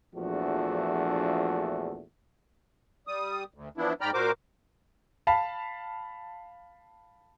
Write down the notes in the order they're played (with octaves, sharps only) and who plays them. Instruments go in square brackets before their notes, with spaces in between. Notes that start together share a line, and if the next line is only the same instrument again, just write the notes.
[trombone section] A#1 E2 F3 A3 D4 F#4
[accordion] G3 D#6
D2
E3 F3 B3 D4 E4
G#2 D5 G5 A#5 B5 F6
A#2 F#4 A#4 C5 D6
[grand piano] F5 A5 B5